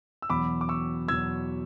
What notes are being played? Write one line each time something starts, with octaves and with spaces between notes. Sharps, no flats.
E6
E2 B2 F#3 B5 D6
D6
C#6 E6
E2 B2 F#3 E6 G#6